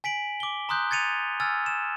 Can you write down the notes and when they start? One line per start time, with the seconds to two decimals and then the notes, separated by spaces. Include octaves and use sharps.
0.04 G#5 B6 D7 F#7
0.40 D6 G7
0.69 A#5 C6 D#6 F#6 G6
0.91 G#6 A6 C#7 D#7 F7
1.40 G#5 E6 F6 G#6 A6
1.66 E7